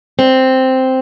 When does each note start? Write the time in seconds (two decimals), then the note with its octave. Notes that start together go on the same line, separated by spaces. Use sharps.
0.19 C4